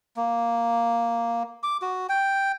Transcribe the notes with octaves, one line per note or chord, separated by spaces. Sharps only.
A#3
D6
F#4
G5